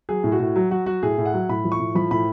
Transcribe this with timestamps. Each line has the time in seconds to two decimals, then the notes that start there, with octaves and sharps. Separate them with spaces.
0.09 F#3 G#4
0.24 A2
0.32 F#4
0.40 A2
0.56 F#3
0.71 F#3 F#4
0.86 F#3 F#4
1.03 A2 G#4
1.18 A2
1.25 F#5
1.34 F#3
1.49 A2 B5
1.64 F3
1.72 C#6
1.79 A2
1.95 F3 B5
2.11 A2 B5